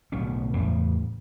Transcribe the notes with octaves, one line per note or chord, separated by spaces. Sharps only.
D1 B1 C#4
E2 A2 C#3